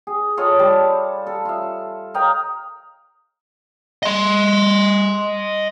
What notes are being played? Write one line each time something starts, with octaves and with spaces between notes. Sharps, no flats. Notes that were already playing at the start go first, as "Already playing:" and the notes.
G#4
F4 A4 C#5 D#5
G3 A5
A4
F4 E5
A#4 D#5 F5 G5
D#5 C6